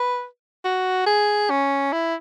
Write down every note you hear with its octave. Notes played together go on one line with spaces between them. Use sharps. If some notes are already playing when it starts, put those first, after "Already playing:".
Already playing: B4
F#4
G#4
C#4
E4